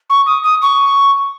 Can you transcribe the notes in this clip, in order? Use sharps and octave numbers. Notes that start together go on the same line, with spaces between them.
C#6
D#6
D#6
C#6